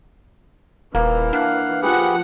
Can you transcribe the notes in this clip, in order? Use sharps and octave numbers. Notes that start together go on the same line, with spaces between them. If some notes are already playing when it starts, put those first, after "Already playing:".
D#1 E3 A#3
D4 F5 F#5
F3 G4 G#4 B4 F#5